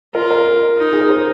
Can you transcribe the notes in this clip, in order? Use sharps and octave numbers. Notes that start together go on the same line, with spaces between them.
F4 A#4
A#4
D#4
G#4
A#4
G#4 C5